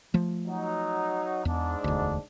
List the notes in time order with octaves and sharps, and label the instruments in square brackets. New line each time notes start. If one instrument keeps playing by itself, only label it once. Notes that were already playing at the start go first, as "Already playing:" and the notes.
[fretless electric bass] F3 A3
[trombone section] F#3 D#4
[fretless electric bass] E2 [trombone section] G#2 D4
[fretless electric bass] E1 D2